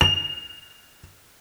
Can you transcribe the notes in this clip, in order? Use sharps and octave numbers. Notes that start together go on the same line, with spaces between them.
F7